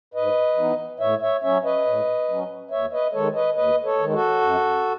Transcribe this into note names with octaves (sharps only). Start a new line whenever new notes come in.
G#2 B4 D#5
E3 B3 D#4
A2 C#5 E5
C#5 E5
F#3 C#4 C#5 E5
B4 D#5
A2
F#3 C#4
D#2 C#5 E5
B4 D#5
D#3 G#3 A4 C#5
B4 D#5
D#2 B4 D#5
A4 C#5
D#3 G#3
F#4 A4
F#2